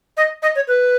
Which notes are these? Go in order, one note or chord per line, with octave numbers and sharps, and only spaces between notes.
D#5
D#5
C#5
B4